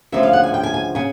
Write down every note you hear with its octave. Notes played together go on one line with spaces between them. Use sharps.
D2 C#3 F3 E5
F5
F#5
G#5
G5
G#5
G#5
C#3 G#5